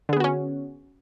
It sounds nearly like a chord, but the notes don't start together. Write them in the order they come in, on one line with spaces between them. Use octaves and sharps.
D3 G#4 B3 F#4 C#4